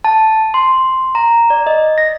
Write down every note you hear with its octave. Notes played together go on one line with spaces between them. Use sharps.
A5
C6
A#5
D5
D#5
A#6